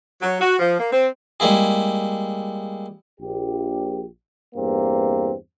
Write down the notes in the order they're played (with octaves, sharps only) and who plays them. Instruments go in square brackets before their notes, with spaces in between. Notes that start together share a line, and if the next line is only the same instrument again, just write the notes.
[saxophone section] F#3
F#4
F3
A#3
C4
[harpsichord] G3 G#3 A#3 E4 G#4
[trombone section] A#1 G4
E2 G2 A#3 C4